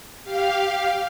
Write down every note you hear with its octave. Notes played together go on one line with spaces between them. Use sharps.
G4 F5